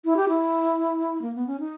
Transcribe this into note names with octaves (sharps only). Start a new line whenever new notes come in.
E4
G4
E4
A#3
B3
C#4
D#4